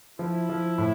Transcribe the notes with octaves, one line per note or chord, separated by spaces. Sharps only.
F3 E4
F3
A2